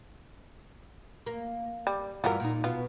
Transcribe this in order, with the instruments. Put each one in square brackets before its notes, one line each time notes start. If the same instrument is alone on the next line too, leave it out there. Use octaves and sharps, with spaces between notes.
[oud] A#3
[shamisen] G3
[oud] G2 E3 B3 [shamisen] F4 F#4 A#4
[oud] A#2 D#4
[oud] B2 B3 [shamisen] F4